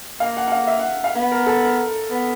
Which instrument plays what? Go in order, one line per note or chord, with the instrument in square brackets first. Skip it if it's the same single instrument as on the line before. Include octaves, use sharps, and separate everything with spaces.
[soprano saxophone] A#3 [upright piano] F5
[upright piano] F#5
F#5
F5
E5
F#5
F5
[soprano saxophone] B3
[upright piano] A#4
A4
A#4
[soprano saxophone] B3